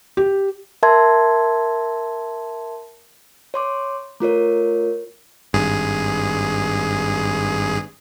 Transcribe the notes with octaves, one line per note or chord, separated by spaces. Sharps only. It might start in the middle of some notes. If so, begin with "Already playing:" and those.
G4
A#4 E5 A5 C6 G#6
C#5 C6 D6
A3 F4 A#4 C#5
G#1 G2 G#4